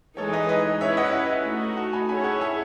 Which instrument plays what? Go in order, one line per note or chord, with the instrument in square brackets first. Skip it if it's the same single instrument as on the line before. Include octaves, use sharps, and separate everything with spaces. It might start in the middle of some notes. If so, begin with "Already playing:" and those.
[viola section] E3 G#3 D#4 G#4 [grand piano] A4 C#5
[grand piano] B4 D#5
B4 D#5
[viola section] C#4 E4 B4 [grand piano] C#5 E5
[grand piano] D#5 F#5
D#5 F#5
[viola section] A3 D#4 F#4
[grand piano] F#5 A5
G#5 B5
[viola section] C#4 E4 G#4 C#5 [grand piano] G#5 B5
[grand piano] F#5 A5
E5 G#5